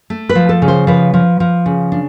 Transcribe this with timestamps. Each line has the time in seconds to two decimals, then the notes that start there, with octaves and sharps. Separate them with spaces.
0.10 A3
0.29 B4
0.35 F3
0.49 A4
0.62 C#3
0.68 C5
0.87 F3 B4
1.14 F3
1.40 F3
1.66 C#3
1.92 D4